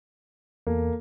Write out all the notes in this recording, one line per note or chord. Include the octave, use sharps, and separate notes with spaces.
E2 A#3 A4